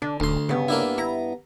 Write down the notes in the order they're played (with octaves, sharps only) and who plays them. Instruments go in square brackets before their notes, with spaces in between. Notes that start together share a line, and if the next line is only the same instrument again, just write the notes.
[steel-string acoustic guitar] D3 [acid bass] D4
[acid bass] D#1 [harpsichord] D2 C6
[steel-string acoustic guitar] G2 B3 [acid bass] C#3
[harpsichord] A#3 D4 E4
[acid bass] E4 [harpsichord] A#5